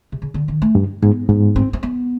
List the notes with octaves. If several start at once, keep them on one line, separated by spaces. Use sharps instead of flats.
C3
C#3
D3
D#3
A3
G2
G#2 B3
G#2 B3
C4
C4
B3